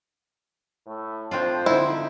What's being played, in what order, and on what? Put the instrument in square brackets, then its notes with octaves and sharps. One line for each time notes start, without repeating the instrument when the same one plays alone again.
[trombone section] A2 A3
[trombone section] F2 C5 [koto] C4 D4 F4
[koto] D3 D#4 [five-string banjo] E4